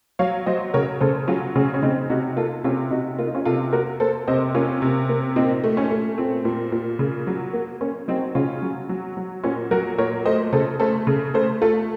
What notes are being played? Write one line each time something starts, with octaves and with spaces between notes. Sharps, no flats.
F#3 C#5 F5
F#3 C5 D#5
C#3 A#4 C#5
C#3 A4 C5
F#3 C#4 F4
C#3 C#4
C#4
C#3 C4 D#4
C3 D#4 F#4
A#3 F4 A4
C3 C#4 F4
C3 D#4 F#4
A#3 F4
D#4
C#4 F4
C3 F4 A4
A#3 F#4 A#4
A#3 A4 C5
C3 C5 D#5
A#3 C#4 F4
C3
A#3
A#2 C4 D#4
A3
C#4
A3
A#2 C4
A#2
A#2
C#3
F#3
A#3
A#3 C#4
F#3 C4 D#4
C#3 C#4 F4
F#3
F#3
F#3
A#2 C#4
F#3 F#4 A#4
A#2 A#4 C#5
A3 C5 D#5
C#3 A4 C5
A3 A4 C5
C#3
A3 A4 C5
A3 F4 A4